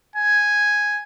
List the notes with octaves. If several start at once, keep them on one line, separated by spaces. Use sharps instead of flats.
G#5